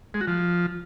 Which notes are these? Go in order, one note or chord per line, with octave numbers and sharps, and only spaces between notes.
G#3
F#4
F3